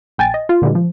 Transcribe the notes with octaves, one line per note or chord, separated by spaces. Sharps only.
A#1 G5 G#5 A6
D#5
F4
A#2 D3 E3 G3 G#3
F3